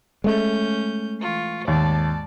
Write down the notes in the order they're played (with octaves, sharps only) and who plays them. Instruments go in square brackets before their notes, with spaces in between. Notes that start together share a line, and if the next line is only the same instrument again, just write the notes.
[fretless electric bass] G#3 A3 [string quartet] C#4 G6
[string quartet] E3 F4 C#6
[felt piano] D#2 [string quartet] G#2 D5 A5